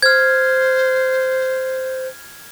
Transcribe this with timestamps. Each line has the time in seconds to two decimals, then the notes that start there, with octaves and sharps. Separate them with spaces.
0.02 C5 F6 G#6